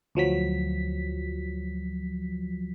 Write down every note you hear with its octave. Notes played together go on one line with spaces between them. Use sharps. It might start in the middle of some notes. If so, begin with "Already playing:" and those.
D2 F3 F#3 B6